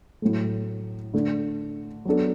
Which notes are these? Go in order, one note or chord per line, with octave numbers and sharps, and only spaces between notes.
A2 F#3 A3
D3 A3 D4
F#3 B3 D4 A4